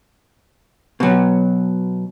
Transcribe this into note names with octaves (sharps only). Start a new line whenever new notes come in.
B2 F#3